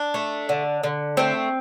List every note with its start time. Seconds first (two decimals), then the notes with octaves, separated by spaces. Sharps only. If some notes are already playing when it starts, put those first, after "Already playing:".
Already playing: D4
0.14 A3
0.49 D3
0.84 D3
1.17 A3 C4